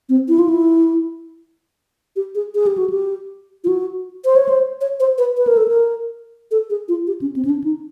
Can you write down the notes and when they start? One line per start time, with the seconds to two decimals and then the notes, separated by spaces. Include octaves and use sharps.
0.09 C4
0.28 E4
0.39 F4
0.49 E4
2.16 G4
2.35 G#4
2.55 G#4
2.67 G4
2.78 F#4
2.90 G4
3.64 F4
3.68 F#4
4.25 C5
4.36 C#5
4.49 C5
4.81 C#5
5.00 C5
5.18 B4
5.37 B4
5.47 A#4
5.57 A4
5.68 A#4
6.51 A4
6.70 G#4
6.88 F4
7.07 G4
7.21 C#4
7.36 C4
7.45 C#4
7.50 D4
7.64 D#4